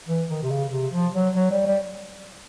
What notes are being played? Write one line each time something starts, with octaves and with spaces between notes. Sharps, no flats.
E3
D#3
C3
C#3
C3
F3
F#3
F#3
G3
G3